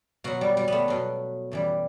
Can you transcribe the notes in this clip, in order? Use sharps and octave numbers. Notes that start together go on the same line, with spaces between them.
B2 F#3 F#4
G3
G3
A3 B3
B2 F#3
F#2 E3 G3